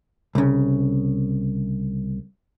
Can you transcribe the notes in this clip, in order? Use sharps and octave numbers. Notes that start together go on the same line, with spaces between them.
C2 C#3